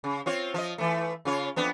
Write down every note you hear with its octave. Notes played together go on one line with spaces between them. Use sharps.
C#3
C4 F4 C#5
F3 D#5
E3 A3
C#3 F4 C#5
F2 B3 D4